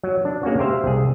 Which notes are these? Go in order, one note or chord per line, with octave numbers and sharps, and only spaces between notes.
F#3
D4
G#3 A#3 C#4 F#4
G4 A#4 C5 E5 F5
C2 G#4